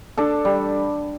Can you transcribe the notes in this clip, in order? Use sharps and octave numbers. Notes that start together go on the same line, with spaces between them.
D4 A4
G3